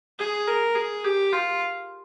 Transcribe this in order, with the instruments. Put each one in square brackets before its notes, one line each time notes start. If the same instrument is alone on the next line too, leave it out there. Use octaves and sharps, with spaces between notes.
[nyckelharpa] G#4
A#4
G#4
G4
F4